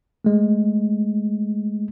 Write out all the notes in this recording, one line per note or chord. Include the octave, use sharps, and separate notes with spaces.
G#3 A3